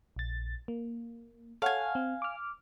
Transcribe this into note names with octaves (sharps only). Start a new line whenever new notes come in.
A#1 A6
A#3
A4 C#5 F5 F#5 G#5
C4
D6 F6